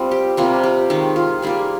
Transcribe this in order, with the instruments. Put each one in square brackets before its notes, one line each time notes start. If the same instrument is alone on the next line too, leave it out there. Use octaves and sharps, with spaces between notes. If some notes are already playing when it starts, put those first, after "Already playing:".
Already playing: [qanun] G3 C4 F4
G4
C3 G3 A#3 F4
G4
D#3 G#3 D#4
F4
G3 A#3 F4 G#4